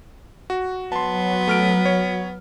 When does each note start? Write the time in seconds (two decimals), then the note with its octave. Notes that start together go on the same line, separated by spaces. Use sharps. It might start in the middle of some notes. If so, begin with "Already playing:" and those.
0.50 F#4
0.92 F#3 B3 A5 C6
1.48 A3 F6 D7
1.85 C#5